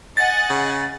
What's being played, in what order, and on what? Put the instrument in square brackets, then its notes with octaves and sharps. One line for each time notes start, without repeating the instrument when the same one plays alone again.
[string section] D#5 F#5 G#5 [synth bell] A6
[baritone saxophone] C#3